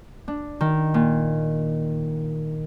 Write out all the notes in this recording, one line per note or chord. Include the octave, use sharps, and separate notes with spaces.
D4
D#3
A#2